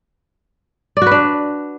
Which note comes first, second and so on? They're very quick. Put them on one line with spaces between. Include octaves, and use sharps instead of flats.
D5 F#4 B4 D4